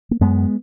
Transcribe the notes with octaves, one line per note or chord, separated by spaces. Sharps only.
A#3
F#2 G#3 B3